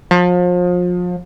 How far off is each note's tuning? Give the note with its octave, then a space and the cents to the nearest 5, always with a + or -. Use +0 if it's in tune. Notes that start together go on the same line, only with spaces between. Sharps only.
F3 +35